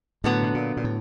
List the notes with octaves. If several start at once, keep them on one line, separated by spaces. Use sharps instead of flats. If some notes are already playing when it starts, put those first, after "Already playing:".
A2 D3 F#3 B3
B2
A#2
A#2
A2